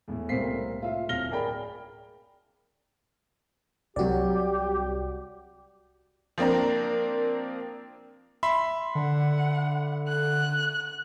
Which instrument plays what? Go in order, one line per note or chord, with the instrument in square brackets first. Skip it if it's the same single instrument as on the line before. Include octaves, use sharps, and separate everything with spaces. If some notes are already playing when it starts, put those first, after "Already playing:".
[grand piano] E2 A2
C2 A2 A#3 C5 B6 C7
F4 E5
D1 F5 F6 A#6 G7
G#4 A#4 D5 G5 B5
[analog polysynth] C2 F#3 [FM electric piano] F#4 D5 [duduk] G4
[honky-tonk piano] F3 A#3 C4 D4 A#4
[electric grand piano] E5 B5 C6
[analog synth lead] D3 [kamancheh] F#5
[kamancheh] F#6